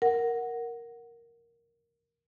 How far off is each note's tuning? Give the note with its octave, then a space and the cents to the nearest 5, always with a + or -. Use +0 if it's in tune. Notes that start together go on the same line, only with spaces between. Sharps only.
A#4 +0 F#5 +0